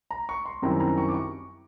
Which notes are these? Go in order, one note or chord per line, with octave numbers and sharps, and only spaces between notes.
A#5
C#6
C6
F#2 D#3 G3 C4 E4 A#5
A#5
C#6
D6
C#6